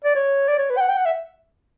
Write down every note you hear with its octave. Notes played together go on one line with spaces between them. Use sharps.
D5
C#5
D5
C#5
B4
G5
F#5
G5
F#5
E5